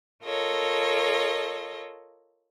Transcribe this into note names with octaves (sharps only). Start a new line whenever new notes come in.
F4 A4 A#4 C#5 D#5